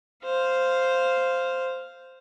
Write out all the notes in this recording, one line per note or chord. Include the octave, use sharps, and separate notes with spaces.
C5 F5